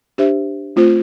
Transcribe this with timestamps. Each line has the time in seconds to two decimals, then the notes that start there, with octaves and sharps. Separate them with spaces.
0.18 D4 G4 C5 E5
0.76 A3 C4 F4 C5